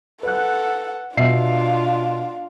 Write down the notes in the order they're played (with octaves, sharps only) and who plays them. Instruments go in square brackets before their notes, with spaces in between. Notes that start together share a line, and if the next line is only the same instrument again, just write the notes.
[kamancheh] A4 F#5 [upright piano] B4 F#6
[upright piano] B2 E5 C7 [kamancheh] D4 F4